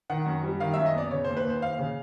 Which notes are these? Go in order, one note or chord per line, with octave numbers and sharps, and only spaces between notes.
D#3 F#5
F#2
G3
D#3 F5
F#2 E5
D#5
B3 D5
C#3 C#5
D#2 C5
B4
D#2 C5
D#2 F5
C#3